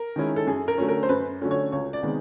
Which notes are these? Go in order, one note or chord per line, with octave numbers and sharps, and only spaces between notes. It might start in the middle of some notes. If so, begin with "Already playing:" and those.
Already playing: A#4
D#3 G#3 C#4 E4
A4
F#2 G#4
A#4
D3 F#3 A3 C#4
A#4
C5
F#2 B4
D3 F#3 A3 C#4
C#5
C#2 C#5
D5
C3 D#3 G#3 B3